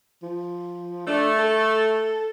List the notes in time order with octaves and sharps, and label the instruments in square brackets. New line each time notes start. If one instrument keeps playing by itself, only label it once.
[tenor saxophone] F3
[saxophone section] A3 [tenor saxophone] D4
[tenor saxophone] A4